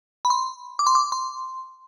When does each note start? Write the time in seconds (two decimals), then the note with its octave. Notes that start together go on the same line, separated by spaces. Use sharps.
0.25 B5
0.30 C6
0.79 D6
0.87 C6
0.95 D6
1.12 C6